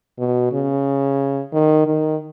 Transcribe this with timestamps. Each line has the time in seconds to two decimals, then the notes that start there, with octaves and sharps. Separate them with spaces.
0.19 B2
0.53 C#3
1.53 D#3
1.86 D#3